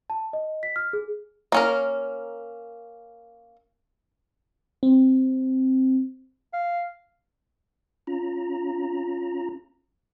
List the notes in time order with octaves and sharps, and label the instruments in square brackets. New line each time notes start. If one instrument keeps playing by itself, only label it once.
[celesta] A5
D#5
B6
F6
G#4
[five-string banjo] A#3 C#4 A#4
[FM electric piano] C4
[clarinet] F5
[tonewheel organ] C#4 F4 A#5